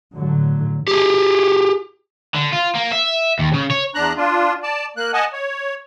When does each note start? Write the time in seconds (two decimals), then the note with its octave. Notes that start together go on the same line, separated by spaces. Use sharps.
0.12 A2 D3 F#3
0.88 G4 G#4
2.35 D3
2.53 F4
2.75 A#3
2.92 E5
3.39 D#2
3.54 C#3
3.71 C#5
3.94 E2 D4 A#5 F#6
4.17 D4 F4
4.63 D5 A5
4.97 A#3 F#6
5.13 D#5 F#5 G#5 A5
5.33 C#5